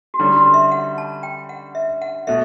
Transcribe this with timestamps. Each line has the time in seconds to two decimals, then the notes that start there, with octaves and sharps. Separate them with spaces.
0.14 F#4
0.19 D3 G3 C#4 E4
0.36 F#4
0.54 E5
0.72 F#5
0.98 A5
1.23 G5
1.49 F#5
1.75 E5
2.02 F#5
2.27 B2 A3 E5